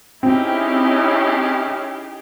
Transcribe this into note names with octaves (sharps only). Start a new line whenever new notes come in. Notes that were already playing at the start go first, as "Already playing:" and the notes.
C4 C#4 D#4 E4 G4 G#4